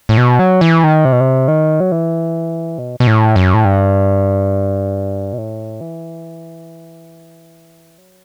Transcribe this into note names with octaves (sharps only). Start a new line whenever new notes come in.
A2
B2
F#3
E3
D#3
C3
B2
C3
D#3
F#3
E3
B2
B2
A2
F#2
A2
G2
B2
A2
E3
F#3